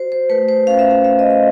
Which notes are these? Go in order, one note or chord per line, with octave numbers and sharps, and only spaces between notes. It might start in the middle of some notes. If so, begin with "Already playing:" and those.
Already playing: F#4 C5
C5
A3 B4
C5
C#4 F5
E5
F5
A3 E5
D#5
E5